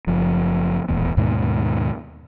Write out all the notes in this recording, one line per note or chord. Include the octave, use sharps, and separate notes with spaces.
F#1 F3
D#1 A1 E2 B3
D#2 G#2 B2 D#3